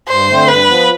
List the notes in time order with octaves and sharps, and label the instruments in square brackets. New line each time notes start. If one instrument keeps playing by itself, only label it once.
[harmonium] G2 [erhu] C5
[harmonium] D3 A3 C4
[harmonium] G2 [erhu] B4
[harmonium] F3 B3